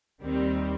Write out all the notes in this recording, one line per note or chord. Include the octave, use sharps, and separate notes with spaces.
D#2 D#3 G3 C4